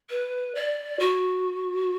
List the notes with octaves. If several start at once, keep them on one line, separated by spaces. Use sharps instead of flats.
B4
D5
F#4